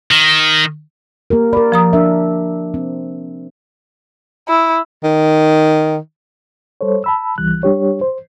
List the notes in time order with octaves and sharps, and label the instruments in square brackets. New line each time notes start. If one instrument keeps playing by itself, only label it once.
[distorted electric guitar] D#3
[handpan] A#3 G4 A#4
[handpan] A#4 D5 [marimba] B5
[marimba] F3 A#5 D#6
[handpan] D4 A#4 E5
C4
[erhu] E4
[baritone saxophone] D#3
[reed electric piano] G3 A4 C5 C#5
A5 B5 E6
C#2 E3 G3 F#6
G3 D4 G4 C#5
C5